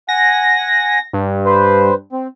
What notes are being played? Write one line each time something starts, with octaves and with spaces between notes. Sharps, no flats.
F#5 G#5 A#6
G2
B4 C5
C4